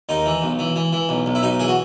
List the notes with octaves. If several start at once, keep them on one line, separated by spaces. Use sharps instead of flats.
D#2 D#4
E3
B1
E3
E3
E3
B1
B1
E4
B1 D#4
E3 G#4
F#4